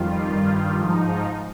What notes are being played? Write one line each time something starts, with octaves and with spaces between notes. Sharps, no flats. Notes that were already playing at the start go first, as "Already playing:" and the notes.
Already playing: F2 D#3 G3 F4
G2 D#3 G3
G#2 F3 D#4